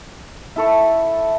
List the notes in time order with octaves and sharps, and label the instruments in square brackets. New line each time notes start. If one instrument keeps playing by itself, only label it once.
[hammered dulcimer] E4 A4 C#6